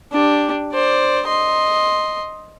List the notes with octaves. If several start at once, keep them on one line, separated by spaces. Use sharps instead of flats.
D4 G4
C5 D5
D#5 C6